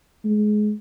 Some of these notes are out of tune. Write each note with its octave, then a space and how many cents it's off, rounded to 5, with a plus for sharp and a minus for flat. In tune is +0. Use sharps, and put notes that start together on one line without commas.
G#3 +25